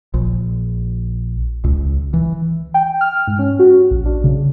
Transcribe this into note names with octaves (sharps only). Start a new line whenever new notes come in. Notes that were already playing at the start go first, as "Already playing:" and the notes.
A#1
C#2
E3
G5
F6
G#2
C#4
F#4
A#1
D4
C#3